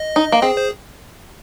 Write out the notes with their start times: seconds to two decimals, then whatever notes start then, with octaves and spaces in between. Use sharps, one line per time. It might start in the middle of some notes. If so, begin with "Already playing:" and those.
Already playing: D#5
0.16 D#4
0.32 A#3
0.42 C4 G#4
0.57 C5